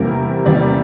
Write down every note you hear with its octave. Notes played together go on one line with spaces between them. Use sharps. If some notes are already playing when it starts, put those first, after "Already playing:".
Already playing: E2 C3 G3 A#3 A#4
E2 C3 G3 A#3 D5